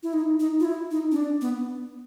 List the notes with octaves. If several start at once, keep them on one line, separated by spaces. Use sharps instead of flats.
E4
D#4
D#4
F4
E4
D#4
C#4
D4
B3